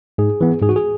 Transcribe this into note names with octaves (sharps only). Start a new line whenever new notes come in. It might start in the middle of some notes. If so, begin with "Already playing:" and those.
G#2 G#4
E3 B3
G#2 G#4
F#4
G#4